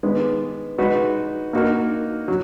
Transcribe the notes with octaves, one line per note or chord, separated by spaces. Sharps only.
D#3 G#3 B3
G#3 D#4 F#4 B4
A#3 D#4 F#4 A#4
F#3